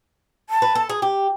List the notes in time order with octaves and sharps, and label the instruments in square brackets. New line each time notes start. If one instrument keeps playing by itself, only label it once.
[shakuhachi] A5
[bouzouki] B4
A4
G#4
G4